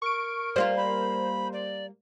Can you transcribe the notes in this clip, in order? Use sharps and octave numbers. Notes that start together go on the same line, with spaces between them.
A#4 C#6 D7
G3 A#3 F4 C5
B5
D5